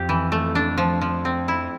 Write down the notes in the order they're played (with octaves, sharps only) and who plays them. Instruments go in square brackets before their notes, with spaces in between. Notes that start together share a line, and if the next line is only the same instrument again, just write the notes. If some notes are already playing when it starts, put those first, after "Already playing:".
Already playing: [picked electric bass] F2 [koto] G4
[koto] E3
A3
D4
F3
F3
C4
E4